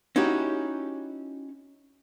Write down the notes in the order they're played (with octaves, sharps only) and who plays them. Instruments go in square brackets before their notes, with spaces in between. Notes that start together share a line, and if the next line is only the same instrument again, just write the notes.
[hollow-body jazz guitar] C#4 D#4 E4 F#4 G4